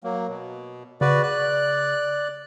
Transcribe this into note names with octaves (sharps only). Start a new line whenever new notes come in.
F#3 A#3
B2
C#3 F#4 B4 D5
D5 F#6